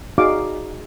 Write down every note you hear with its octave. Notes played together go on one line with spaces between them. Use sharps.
D#4 F#4 G#4 D5 F5 D6